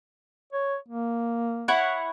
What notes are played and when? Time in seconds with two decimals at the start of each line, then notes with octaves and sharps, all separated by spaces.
0.53 C#5
0.89 A#3
1.68 E4 C#5 F#5